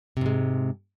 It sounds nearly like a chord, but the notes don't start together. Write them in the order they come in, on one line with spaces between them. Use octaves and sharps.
C3 G#2 G#3